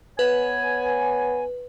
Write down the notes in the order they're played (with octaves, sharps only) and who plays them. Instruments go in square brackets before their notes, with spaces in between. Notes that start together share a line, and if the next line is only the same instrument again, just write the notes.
[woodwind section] B3 C#5 G#5 [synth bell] B4